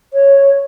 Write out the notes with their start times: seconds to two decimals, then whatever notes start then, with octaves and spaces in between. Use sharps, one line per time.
0.13 C#5